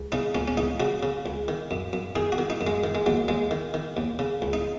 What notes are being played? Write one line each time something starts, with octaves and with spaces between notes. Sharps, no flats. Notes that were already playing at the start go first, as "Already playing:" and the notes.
Already playing: C#2
C#3 D#4
C#2 C#4
C#4
C#2 D#4
C#3 F#4
C#3
C#2
D#3
F#2
F#2
D#3 G#4
F#4
D#3
D#4
F#2
G#3
D#3
G#3
D#2 F#3
D#2 G#3
D#3
D#3
D#2
C#3
C#2
D#4